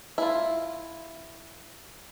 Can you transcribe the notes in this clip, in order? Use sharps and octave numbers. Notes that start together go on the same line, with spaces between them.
E4 F4